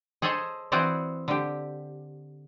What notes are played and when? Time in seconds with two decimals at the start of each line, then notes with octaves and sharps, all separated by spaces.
0.22 G#4 A4 C5 C#5 D#5
0.72 E3 C4 F#4 G#4 C5 D5
1.28 D3 G4